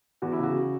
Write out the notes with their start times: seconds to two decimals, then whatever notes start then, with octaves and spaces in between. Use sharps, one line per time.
0.22 E2 F#4
0.32 E4
0.39 C#3 F#4